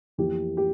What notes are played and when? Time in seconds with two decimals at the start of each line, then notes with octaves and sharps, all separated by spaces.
0.18 F2 E3 A#3 G4
0.57 G4